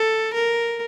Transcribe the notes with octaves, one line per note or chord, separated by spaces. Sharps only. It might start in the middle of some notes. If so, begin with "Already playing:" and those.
Already playing: A4
A#4